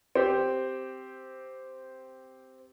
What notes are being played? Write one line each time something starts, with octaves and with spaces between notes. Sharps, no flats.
C4 G4